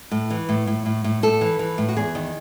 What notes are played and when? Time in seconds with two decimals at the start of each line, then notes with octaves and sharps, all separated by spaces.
0.11 A2
0.30 E3
0.49 A2
0.67 A2
0.86 A2
1.04 A2
1.23 A2 A4
1.41 E3
1.59 E3
1.78 A2
1.88 F#4
1.96 E2 G#4
2.15 D#3